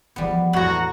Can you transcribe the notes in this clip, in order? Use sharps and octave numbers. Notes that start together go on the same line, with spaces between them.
E3 F3 G3 B3
E2 A2 F#4 F#5 A#5